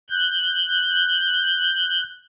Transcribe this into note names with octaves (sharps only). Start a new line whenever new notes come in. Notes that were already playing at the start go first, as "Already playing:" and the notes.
F#6 G6